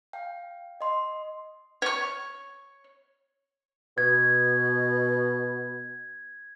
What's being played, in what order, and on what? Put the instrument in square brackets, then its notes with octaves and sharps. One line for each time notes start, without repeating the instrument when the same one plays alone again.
[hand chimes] F5 G5
D#5 C6
[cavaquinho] C#5 C#6
[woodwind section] B2 [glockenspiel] G#6